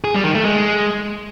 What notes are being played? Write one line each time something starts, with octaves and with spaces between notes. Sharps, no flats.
G#4
G3
D#3
A3
G#3